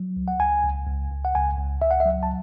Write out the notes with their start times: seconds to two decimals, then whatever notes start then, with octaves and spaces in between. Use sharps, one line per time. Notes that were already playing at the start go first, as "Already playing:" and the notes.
Already playing: F#3
0.16 C#2
0.28 F#5
0.40 C#2 G#5
0.64 C#2
0.87 C#2
1.11 C#2
1.25 F#5
1.35 C#2 G#5
1.58 C#2
1.82 C#2 E5
1.91 F#5
2.00 E5
2.06 F#3
2.23 A5